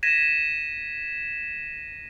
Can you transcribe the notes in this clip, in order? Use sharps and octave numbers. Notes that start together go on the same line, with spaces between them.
G#6 A#6 B6 D#7 E7